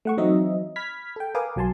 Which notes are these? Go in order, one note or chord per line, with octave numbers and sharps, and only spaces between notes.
A3 F#5 C#6
E3 F#3 C4 D#4 D#5 E5
B5 F6 G#6 B6
A4 G5
A#4 B4 F5 G#5 D6 D#6
B1 F#3 G#5 A5 C6